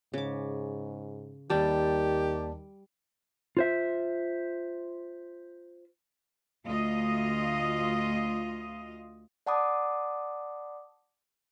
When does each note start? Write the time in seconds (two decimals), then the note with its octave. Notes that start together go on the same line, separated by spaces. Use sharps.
0.14 G#2 C#3 D6
1.50 D#2 D#3 G3 G4 D5 A5
3.57 F4 C5 E5
6.65 D2 F4 D#5
9.46 D5 F#5 A5 B5 D6 D#6